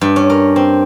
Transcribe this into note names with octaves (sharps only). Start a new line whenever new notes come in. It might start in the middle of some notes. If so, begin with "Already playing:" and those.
G2
C#4
A#4
C4